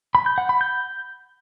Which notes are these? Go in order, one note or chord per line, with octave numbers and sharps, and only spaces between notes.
B5
G6
F#5
B5
G6